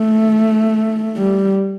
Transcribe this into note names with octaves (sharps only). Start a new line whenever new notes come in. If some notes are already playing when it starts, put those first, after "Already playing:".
Already playing: A3
G3